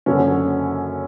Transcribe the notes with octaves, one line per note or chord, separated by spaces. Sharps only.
F#1 F#2 D3 C#4